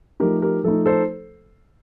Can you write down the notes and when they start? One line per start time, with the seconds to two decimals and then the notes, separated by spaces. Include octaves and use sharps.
0.20 F3 A3 D#4 G4 A#4
0.42 G4 A#4
0.64 F3 A3 D#4 A4
0.86 A4 C5